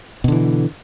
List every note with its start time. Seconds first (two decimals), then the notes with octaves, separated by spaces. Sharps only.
0.24 B2
0.28 D3
0.32 E3